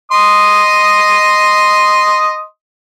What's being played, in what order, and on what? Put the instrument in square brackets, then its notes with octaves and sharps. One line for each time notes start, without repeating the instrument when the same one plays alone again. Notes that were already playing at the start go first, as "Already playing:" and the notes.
[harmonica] D#5 C6 D#6